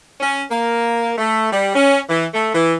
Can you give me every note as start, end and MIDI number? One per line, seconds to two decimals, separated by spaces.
0.20 0.42 61
0.51 1.13 58
1.18 1.52 57
1.52 1.73 55
1.74 2.00 61
2.09 2.25 52
2.34 2.51 57
2.54 2.77 52